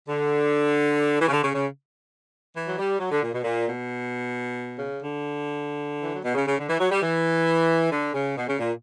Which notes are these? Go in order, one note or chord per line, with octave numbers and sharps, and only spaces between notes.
D3
E3
C#3
D3
C#3
C#3
E3
F#3
G3
F#3
D3
A#2
B2
A#2
B2
C#3
D3
E3
F#3
B2
C#3
C#3
D3
E3
F#3
G3
E3
D3
C#3
B2
C#3
A#2